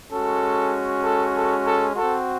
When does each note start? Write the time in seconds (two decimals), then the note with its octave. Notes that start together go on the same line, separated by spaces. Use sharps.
0.11 G#3 C#4 F#4 A4
1.04 A4
1.35 A4
1.65 A4
1.96 C4 F#4 A4